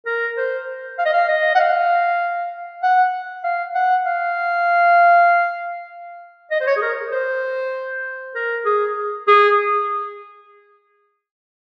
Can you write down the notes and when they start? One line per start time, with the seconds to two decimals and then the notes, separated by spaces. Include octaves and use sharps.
0.06 A#4
0.37 C5
0.99 F5
1.06 D#5
1.13 F5
1.29 D#5
1.55 F#5
1.60 F5
2.83 F#5
3.44 F5
3.75 F#5
4.06 F5
6.51 D#5
6.61 C5
6.67 C#5
6.77 G#4
6.82 A#4
7.12 C5
8.35 A#4
8.65 G#4
9.28 G#4